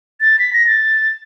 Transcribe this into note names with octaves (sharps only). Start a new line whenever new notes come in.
A6
B6
A#6
A6